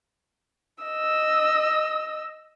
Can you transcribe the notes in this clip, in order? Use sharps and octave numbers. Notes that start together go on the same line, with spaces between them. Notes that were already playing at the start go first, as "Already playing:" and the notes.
D#5 E6